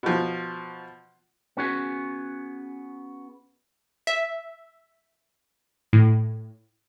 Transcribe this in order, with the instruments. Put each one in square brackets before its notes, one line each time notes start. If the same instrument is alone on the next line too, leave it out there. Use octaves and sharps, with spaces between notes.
[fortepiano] B2 F3
[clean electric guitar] B3 C#4 F#4 G#4
[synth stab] E5
A2